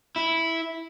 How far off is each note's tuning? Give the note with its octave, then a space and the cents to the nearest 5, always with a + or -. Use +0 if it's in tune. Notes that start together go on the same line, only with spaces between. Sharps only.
E4 -5